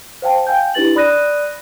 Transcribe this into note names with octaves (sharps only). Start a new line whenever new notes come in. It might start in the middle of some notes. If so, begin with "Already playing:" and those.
C5 F5 G5 A5
F5 G5 G#5 G6
D4 E4 G4 B4 A6 F#7
D5 B5 D#6 F#6 A#6 D#7